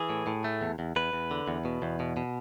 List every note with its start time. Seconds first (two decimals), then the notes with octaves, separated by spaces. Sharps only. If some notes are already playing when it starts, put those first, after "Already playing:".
Already playing: E3 G#4
0.10 A2
0.27 A2
0.44 A3
0.62 E2
0.79 E2
0.96 E2 B4
1.13 E2
1.31 D3
1.48 E2
1.65 B2
1.82 E2
2.00 B2
2.17 B2